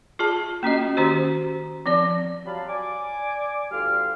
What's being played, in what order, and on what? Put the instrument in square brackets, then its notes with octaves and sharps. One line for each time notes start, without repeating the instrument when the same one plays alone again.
[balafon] F4 G#4 A5
A#3 C#4 F#4 D#5
D#3 C#4 F#4 G4 C5
F3 C4 D5
[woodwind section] F#3 G3 F4 F5 A5 B5
D5 G#5 D6
D2 G3 F4 F6